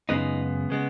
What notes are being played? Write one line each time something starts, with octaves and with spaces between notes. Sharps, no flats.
F#2 C#3 G#3 B3 D#4
C#3 G#3 B3